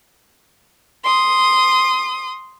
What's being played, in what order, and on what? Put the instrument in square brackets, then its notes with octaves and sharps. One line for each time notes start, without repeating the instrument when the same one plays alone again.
[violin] C6 D#6